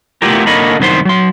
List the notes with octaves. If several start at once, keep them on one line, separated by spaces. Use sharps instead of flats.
A3 B3 E4 F4 G4 A#4
D3 A#3 A#4 C#5 D#5 B5
C2 F#2 D#3 B3 C5 C6
F#3 C6